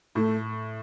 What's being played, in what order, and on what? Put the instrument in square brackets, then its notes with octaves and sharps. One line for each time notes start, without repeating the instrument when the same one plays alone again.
[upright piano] A2 [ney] A3